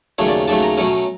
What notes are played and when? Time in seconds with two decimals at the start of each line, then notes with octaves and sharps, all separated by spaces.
0.18 D#2 C#3 F#3 A3 C#5
0.28 D5
0.48 D#2 C#3 F#3 A3 A5
0.63 A#5
0.77 B2 F#3 A3 C#4